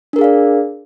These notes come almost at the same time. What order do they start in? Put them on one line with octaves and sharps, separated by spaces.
D4 A#4 G#4 F5 D5